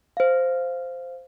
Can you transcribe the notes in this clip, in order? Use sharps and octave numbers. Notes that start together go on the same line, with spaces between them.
C5 F5